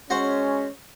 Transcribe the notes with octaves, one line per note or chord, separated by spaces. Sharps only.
G#3 C#4 F#4 C5 F#5